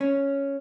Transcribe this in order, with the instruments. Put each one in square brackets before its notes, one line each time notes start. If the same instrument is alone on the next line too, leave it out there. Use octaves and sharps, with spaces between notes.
[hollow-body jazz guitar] C#4